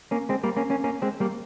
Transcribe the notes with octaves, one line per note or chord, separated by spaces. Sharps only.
A#3 C#4
G#3 C4
G3 A#3
A#3 C#4
A#3 C#4
A#3 C#4
G#3 C4
G3 A#3